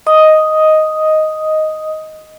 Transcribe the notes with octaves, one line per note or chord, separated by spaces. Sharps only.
D#5 D#6